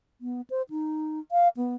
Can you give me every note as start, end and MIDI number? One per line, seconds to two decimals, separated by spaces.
0.21 0.41 59
0.50 0.62 72
0.70 1.19 63
1.31 1.48 77
1.57 1.75 59